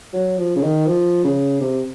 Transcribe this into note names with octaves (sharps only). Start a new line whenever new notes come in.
F#3
F3
C#3
D#3
F3
C#3
C3